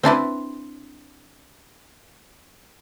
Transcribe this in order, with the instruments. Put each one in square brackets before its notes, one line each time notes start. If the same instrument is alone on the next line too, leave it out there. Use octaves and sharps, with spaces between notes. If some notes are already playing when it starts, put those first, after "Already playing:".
[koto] C4 D4 E4 B4